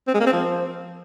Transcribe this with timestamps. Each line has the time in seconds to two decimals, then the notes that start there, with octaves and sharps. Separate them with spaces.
0.08 C4
0.14 G#3
0.20 A#3
0.26 C4
0.33 F3